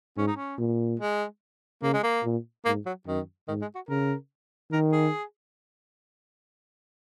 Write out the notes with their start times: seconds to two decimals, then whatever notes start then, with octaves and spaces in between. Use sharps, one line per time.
0.18 G#2 C#4
0.27 D#4
0.36 C#4
0.58 A#2
1.00 G#3
1.82 C#3 A#3
1.94 G#3
2.03 A#3
2.24 A#2
2.65 G#2 A#3
2.86 F#3
3.07 F#2 D#3
3.48 G#2 D#3
3.61 G#3
3.75 F#4
3.89 C#3 A#4
4.71 D#3 A#4
4.92 G#4